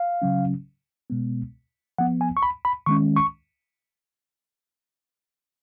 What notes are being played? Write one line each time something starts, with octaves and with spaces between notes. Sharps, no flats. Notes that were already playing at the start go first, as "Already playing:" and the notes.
Already playing: F5
C#3 F#3 C#4
B2 G#3 B3
F3 B3 F#5
G#5
C#6
B5
B5
D#3 G#3 C#4 C#6
C#6